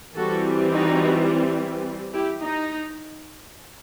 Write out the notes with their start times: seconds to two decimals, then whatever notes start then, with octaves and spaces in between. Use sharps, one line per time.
0.16 E3 G3 C4 F#4 A4
0.72 D#4 F#4
2.13 E4 G4
2.41 D#4